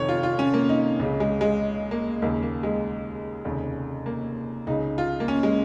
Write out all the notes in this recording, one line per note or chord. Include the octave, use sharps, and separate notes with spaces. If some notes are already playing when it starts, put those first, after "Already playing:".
Already playing: F1 F2 D#3 C#5
F4
F4
C#4
A#3
D#4
C#2 C#3
G#3
G#3
A#3
D#2 C#3 A#3
A#3
G#3
F1 D#2 C#3
A#3
C#2 C#3 D#4
F4
A#3
C#4
G#3